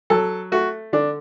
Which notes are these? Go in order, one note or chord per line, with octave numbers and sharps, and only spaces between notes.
F#3 A4
A3 F#4
D3 D4